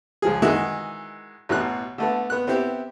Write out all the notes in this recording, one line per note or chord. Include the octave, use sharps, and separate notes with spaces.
C#2 F3 G#4
D#3 E3 G#3 E4 F#4 E5
A1 B2 F#6
D3 A3 B3
B3 F#6
B3 C4 E4 G4